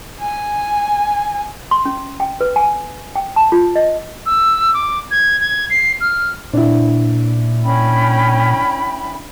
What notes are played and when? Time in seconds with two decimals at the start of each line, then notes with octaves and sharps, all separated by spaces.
0.20 G#5
1.71 C6
1.85 C#4
2.20 G5
2.41 B4
2.56 G#5
3.16 G5
3.36 A5
3.52 F4
3.76 D#5
4.26 E6
4.74 D6
5.11 G#6
5.40 G#6
5.70 C7
6.01 F6
6.53 A#2 D4 E4
7.63 C#4 G5 B5